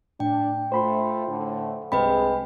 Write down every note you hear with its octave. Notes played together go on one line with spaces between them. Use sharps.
A2 D4 G5
A3 F4 C5 B5 C6
A2 D3
C2 G2 G#3 C4 B4 D#5 G5 B5